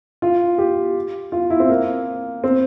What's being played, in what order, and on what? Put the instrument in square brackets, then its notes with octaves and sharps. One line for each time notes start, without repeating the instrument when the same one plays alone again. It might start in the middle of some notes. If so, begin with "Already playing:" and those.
[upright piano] F4
G4
F4
E4
C4
A#3
C4